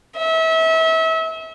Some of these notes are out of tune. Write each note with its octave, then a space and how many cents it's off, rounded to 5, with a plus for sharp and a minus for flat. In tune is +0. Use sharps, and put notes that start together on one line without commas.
E5 -30